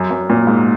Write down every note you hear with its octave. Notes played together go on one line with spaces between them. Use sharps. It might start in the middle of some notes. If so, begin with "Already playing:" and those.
Already playing: F#2
F#2
A#2
G#2